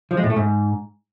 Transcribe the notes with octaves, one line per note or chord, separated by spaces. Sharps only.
F3
G#3
A2
A3
G#2